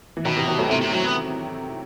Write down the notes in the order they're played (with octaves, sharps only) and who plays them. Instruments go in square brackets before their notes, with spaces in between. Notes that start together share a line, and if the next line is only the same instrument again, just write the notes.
[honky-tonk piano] E3
[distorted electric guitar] B2 [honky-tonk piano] D#3 F#3
[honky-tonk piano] C3 E3
D#3 F#3
F#3 A3
[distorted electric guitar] C3 [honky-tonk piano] A3 C4
[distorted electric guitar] C3
F#3
B3